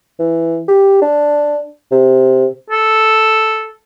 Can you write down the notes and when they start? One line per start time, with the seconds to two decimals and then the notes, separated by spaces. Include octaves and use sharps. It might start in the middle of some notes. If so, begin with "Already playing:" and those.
0.19 E3
0.68 G4
1.02 D4
1.91 C3
2.70 A4